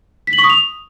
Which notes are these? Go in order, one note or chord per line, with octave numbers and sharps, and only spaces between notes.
B6
F#7
C#6
D#6
F7